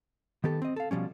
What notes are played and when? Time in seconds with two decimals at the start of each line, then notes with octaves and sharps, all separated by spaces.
0.44 D#3 B3 G4 A4
0.62 C4 D#5
0.76 A4 F5
0.91 B2 F3 G3 C#4